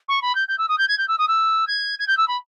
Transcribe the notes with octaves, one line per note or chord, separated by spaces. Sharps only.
C#6
B5
G6
G6
E6
D#6
G6
G#6
G6
E6
D#6
E6
G#6
G#6
G6
E6
B5